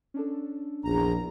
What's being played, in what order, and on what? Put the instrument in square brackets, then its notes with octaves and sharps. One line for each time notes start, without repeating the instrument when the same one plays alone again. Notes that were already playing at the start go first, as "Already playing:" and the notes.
[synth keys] C#4 D4 A4
[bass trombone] A#1 [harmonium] E2 A#5